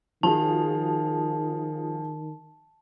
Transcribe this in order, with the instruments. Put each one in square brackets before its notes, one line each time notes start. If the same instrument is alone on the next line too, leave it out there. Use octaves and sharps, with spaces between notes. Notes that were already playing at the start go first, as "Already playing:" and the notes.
[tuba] D#3 [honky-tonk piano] F3 F#4 G#4 [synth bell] A5